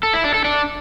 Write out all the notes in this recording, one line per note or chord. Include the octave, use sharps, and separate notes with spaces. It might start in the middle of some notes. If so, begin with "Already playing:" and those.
A4
E4
D4
A4
D4